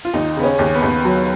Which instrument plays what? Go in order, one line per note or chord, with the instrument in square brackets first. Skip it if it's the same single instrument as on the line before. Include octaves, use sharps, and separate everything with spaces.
[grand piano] F4
[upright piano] D#2 [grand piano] D#4
[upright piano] C#3 [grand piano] B3
[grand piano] C#4
[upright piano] D#2
[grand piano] B3
[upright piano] D#2
F#3